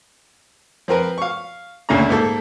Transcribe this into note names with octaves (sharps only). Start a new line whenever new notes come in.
F3 C4 A#4 B4
F5 C#6
C#2 A#2 D3 A3 C#4 A#5
G#2 A#3 A4